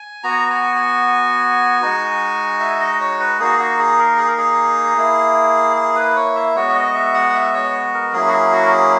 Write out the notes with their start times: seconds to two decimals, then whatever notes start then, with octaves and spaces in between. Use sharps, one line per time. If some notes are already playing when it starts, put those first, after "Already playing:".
Already playing: G#5
0.23 B3 F#4 A#5
0.50 G#5
0.76 G#5
1.81 G#3 D#4 F#4
2.60 E5
2.80 D#5
3.00 C#5
3.20 B4
3.39 A#3 D#4 F#4 G#4
3.59 F#4
3.79 G#4
3.99 A#4
4.18 G#4
4.28 A#4
4.38 G#4
4.97 A#3 E4
5.76 G#4
5.96 B4
6.16 C#5
6.35 E5
6.55 G#3 B3 F#4 C#5
6.69 E5
6.75 D#5
6.95 E5
7.14 F#5
7.34 E5
7.54 C#5
7.94 A#4
8.13 F#3 A#3 C#4 E4 G#4
8.28 F#4
8.33 G#4
8.52 F#4
8.63 A#4
8.72 G#4